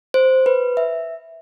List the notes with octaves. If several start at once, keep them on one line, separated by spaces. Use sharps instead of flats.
C5
B4
E5